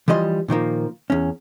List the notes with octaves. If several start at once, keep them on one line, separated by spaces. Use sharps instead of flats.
E3 F3 G3 D#5 C6
A#2 D#3 F3 A#3
E2 C#4